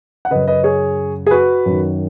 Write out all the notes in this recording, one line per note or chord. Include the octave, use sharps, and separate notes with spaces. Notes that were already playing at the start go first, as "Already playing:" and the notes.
F#5
F#2 C#3 B4 D#5
B4 D#5
G#4 C#5
G#4
F#4 B4
F#2 D#3